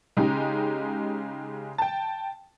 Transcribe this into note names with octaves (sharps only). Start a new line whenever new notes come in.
C#3 G#3 D#4 G4
G5 A5